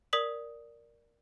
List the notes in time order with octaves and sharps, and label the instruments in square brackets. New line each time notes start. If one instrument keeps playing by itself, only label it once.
[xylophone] A#4 D5 D#6 B6 F#7